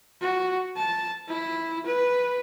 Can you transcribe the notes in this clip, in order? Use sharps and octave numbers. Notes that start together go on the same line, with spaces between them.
F#4
A5
E4
B4